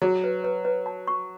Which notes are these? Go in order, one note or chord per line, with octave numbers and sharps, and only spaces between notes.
F#3 G#4
B4
B4
B4
A5
C#6